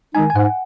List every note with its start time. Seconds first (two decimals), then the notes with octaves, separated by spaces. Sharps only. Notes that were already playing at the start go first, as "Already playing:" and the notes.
0.14 D#3 G#3 D#4 G#5
0.30 G#5
0.36 G#2 F#5